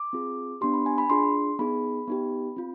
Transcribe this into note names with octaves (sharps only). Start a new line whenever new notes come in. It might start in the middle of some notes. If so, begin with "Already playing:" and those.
Already playing: D6
C4 F4 G#4
B3 D4 G4 C6
B5
G#5
B5
D4 F4 G#4 C6
B3 D#4 G#4 B5
B3 D#4 G4
C4 F4